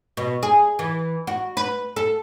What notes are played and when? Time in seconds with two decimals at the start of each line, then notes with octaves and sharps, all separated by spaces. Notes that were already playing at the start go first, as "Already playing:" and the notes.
0.17 B2
0.43 G#4
0.79 E3
1.27 F#4
1.57 B4
1.96 A4